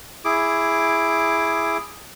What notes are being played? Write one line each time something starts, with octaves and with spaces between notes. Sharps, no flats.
E4 G#4 D6